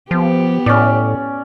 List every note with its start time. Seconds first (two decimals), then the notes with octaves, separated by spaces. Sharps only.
0.11 F3 B3 G4
0.66 A2 C#4 D5